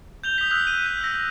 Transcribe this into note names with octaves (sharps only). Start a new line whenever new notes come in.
G6 F7 G7
D#6 B6
D#6 E6 F#6 B6
D#7
G6
E6 A#6